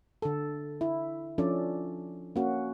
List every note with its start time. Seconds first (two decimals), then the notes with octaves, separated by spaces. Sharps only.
0.22 D3 A4
0.81 E4
1.38 F3 C#4 D4 A4 D5
2.36 A#3 C#4 F#4